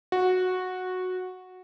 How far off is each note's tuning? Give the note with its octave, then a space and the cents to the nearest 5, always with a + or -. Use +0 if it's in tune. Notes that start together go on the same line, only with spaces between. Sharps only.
F#4 -10